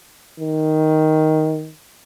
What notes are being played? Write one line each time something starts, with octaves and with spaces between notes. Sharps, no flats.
D#3